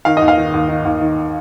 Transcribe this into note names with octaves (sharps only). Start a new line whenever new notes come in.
D#3 F5
D#2 D#5
F5
D#3
D#2
D#3
D#2
D#3